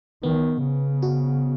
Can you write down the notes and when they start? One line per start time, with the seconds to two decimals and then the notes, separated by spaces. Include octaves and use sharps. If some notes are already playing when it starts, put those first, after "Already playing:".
0.23 D#3 B3
0.63 C#3
1.02 F#4